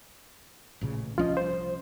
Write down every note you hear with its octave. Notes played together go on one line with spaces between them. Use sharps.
A1 A#2 C#3
C2 F3 C#4 F4 D#5
C5